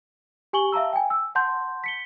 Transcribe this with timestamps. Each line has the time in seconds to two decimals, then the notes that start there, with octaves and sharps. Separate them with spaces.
0.53 G4 G#5 C#6 F#7 G7
0.72 E5 F5 A5 A#5 E6
0.93 G5 G#5
1.10 E6
1.35 F#5 A5 C6 G6
1.84 B6 C#7 G7